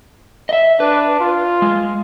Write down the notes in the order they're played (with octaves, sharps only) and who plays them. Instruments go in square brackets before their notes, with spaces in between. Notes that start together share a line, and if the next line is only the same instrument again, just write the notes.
[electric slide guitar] D#5 E5
[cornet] D4 [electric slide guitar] B4
[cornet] F4
[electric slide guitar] G#3